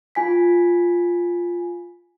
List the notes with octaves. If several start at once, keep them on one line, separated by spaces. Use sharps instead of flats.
F4 G#5 B6